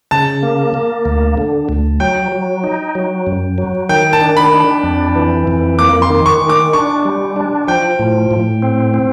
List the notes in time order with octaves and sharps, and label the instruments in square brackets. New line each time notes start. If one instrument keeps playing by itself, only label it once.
[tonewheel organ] C#3 [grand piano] A5
[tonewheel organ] A#3
A#3
D2
D3
D2
[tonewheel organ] F#3 [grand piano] G5
[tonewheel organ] F#3
D#4
F#3
F#2
F#3
[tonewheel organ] D#3 [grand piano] G5
[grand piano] A5
[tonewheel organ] D4
[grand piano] B5
[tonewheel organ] D4
F2
E3
F2
[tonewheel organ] A#3 [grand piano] D6
[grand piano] C6
[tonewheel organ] D#3
[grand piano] C#6
[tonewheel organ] D#3
[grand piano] D6
[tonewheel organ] D4 [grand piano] C#6
[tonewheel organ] G3
D4
[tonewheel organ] F3 [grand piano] G5
[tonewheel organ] A2
A2
C4
C4